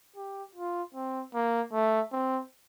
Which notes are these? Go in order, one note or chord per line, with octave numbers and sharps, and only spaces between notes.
G4
F4
C4
A#3
A3
C4